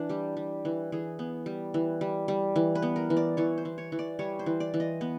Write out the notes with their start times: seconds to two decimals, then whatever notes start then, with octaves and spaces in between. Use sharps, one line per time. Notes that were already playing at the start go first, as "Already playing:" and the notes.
Already playing: E3 D4
0.09 G3 G4
0.37 G3
0.65 E3
0.92 E3 G#4
1.19 B3
1.46 G3
1.74 E3
2.01 G3
2.28 G3
2.56 E3
2.75 B4
2.82 B3
2.96 A#4
3.10 E3
3.17 D5
3.37 E3 C#5
3.58 C5
3.65 E3
3.78 C#5
3.92 E3
3.99 D5
4.19 G3 C#5
4.39 C5
4.46 E3
4.60 D5
4.74 E3
4.80 D#5
5.01 B3